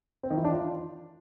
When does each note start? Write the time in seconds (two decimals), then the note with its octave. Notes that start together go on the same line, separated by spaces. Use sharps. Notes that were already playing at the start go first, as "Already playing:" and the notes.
0.23 C4
0.30 D#3
0.37 E3
0.44 D4
0.52 F4